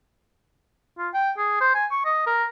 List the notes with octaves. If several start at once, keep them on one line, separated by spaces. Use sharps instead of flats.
F4
G5
G#4
C5
G#5
C#6
D#5
A#4